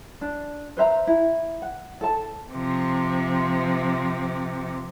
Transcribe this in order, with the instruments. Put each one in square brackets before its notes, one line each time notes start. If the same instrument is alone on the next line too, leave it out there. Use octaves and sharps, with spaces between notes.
[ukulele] D4
B4 C5 E5 A#5
E4
F#5
A4 A5
[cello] C3 F3